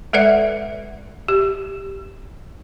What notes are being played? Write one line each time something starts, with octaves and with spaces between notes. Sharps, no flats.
G#3 A4 B4 D5 E5 F#5
G4